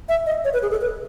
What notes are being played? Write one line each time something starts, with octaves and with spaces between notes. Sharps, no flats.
E5
D#5
C#5
B4
G#4
A4
B4